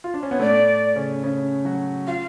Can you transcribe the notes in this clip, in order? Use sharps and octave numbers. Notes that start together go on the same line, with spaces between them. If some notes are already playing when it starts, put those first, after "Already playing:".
F4
D4
C#4
B3 C#5
A2 A3 D5
C#3 C#4
C#3 C#4
F#3 F#4
F4 F5